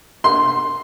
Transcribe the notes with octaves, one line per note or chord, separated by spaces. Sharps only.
C6